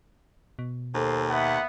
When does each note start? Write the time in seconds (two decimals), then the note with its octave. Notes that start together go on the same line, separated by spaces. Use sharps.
0.59 B2
0.95 D#2 A4 C5
1.30 B3 E5 F#5